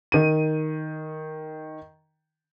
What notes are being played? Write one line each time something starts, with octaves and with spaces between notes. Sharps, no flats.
D#3 D#7